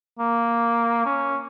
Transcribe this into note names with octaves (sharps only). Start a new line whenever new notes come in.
A#3
C#4